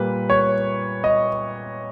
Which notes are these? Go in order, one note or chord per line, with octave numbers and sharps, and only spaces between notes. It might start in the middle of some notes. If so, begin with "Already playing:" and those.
Already playing: A#2 G3 A#3 B4
C#5
D#5